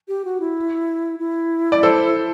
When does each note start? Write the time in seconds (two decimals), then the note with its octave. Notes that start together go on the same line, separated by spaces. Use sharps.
0.08 G4
0.25 F#4
0.40 E4
1.19 E4
1.72 D5
1.83 A4 C5